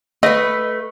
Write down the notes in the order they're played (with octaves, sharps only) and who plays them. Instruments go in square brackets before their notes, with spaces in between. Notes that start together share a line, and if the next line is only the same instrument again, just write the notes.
[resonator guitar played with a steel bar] A3 B4 [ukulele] D#5